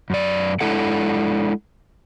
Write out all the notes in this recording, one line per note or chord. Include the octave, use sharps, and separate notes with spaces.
F#2 D5
G#3 D4 E4 A4 F#5